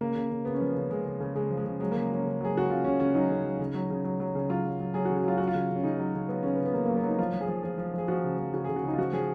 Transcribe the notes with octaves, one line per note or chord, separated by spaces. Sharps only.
C#3 A#3
C#3
C#3
C#3 B3
C#4
F3 B3
C#3
C#3 G#3
C#3
C#3
C#3 G#3
F3
G#3
C#3
F#3 G#3
C#3 A#3
F#3 C#4
C#3
F#3 G#4
C#3 F#4
C#3 F4
C#3 C#4
C#3 C#4
F#3 D#4
C#3
F#3
C#3
F#3
C#3
F#3
F#3
C#3
F#3 F4
F#3
F#3
F#3 G#4
F#4
C#3
F#4
F#3 F4
F#3 F#4
F4
C#3
C#3
C#4
C#3 D#4
F#3
C#3
F#3 B3
C#3 C#4
B3
C#3
B3
C#3 A#3
F#3 A#3
B3
F#3 D#4
F3 F4
F3
G#4
F3
F3 G#4
F3
F3 G#4
F3 F#4
C#3
F3
C#3 F#4
C#3 G#4
F#4
C#3 D#4
F4
F3 F#4
F3 G#4